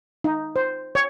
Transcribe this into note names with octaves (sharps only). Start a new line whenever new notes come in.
D#4
C5
C#5